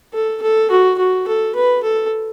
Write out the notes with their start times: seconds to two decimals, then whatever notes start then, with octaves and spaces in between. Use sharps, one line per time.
0.13 A4
0.42 A4
0.71 F#4
0.98 F#4
1.27 A4
1.55 B4
1.83 A4